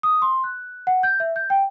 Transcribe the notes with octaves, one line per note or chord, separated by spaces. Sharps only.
D#6
C6
F#6
F#5
G6
E5
G6
G5